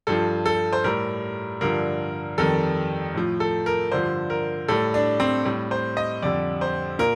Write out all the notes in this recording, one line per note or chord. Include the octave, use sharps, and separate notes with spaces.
G2 F3 A4
A4
C5
A2 G3 A#4
G2 D3 F3 A#4
F2 D#3 G3 A4
A2 F3
A4
A#4
G2 D3 F3 C5
A#4
A2 G3 A4
D4
C4
A2 G3
C5
D#5
F2 D3 G3 D5
C5
A#2 A#4